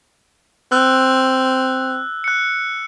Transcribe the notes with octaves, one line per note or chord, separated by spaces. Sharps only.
C4 E6 F#6
F#6 C#7